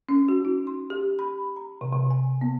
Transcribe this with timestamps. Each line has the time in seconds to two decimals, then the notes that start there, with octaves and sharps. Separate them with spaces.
0.09 C#4
0.29 F#4
0.45 D#4
0.67 C6
0.90 G4
1.19 B5
1.56 A#5
1.81 C3
1.93 C3
2.10 G#5
2.41 B3